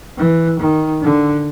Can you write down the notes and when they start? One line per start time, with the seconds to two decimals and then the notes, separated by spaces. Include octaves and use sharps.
0.17 E3
0.59 D#3
1.02 D3